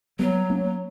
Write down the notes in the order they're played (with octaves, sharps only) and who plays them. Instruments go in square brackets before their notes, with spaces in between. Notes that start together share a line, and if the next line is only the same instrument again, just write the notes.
[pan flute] F#3 [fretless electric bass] G3 B3
[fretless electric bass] A#3 C#4